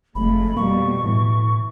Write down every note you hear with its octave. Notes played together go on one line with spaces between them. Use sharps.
F#1 F2 G#3 A3 B5
F2 B2 G3 A#3 C#6
A2 E3